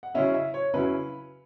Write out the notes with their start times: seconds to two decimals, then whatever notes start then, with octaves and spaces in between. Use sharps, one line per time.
0.03 F#5
0.14 C#3 F#3 C#4 E4 E5
0.34 E5
0.54 C#5
0.74 C#3 F#3 C#4 E4 B4